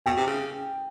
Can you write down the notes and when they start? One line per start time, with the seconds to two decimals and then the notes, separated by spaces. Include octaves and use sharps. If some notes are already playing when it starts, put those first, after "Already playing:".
0.06 B2 G5
0.17 C3
0.27 C#3